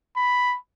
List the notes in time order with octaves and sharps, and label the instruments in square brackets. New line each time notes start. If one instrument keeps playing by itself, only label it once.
[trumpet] B5